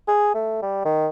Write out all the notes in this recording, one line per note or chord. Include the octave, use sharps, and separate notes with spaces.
G#4
A3
G3
D#3